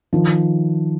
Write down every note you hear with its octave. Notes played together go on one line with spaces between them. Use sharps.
D#3 F3